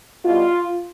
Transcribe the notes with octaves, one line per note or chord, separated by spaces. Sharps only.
B2 G3 F4